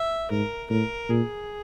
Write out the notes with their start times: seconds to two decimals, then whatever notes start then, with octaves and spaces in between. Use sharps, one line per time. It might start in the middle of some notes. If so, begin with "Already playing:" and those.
Already playing: E5
0.31 G#2 A#4
0.70 A2 A#4
1.09 A#2 G#4